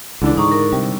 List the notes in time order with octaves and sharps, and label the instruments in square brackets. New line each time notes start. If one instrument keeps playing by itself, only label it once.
[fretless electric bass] C#2 [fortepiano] D3 E3 D4
[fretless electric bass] G#2 [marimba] D#4 A#5 C#6
[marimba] A#4
[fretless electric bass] C3 [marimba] G3